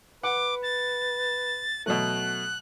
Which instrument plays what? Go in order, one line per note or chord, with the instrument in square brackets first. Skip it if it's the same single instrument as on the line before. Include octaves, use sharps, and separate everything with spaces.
[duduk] B4 [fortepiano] F#5 [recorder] D6
[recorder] A6
[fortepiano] B2 F#3 A3 [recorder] F#6